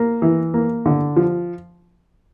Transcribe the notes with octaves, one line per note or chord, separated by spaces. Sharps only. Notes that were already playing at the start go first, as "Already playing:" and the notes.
Already playing: A#3
E3
A#3
D3
F3